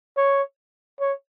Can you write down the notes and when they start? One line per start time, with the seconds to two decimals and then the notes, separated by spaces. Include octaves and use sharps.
0.17 C#5
1.00 C#5